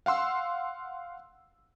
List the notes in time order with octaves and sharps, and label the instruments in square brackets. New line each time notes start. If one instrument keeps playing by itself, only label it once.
[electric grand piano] F5 F#5 C6 E6